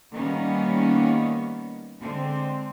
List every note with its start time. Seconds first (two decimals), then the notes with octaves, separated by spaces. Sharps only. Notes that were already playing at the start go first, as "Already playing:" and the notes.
0.12 D#3 G3 A#3 B3 C#4 D#4
2.00 D3 G#3 C4